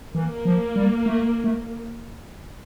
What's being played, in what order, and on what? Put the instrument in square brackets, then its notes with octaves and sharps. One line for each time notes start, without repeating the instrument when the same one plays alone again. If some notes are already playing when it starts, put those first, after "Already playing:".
[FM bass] E3 [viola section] A#3
[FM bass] F3
G3
A3
A3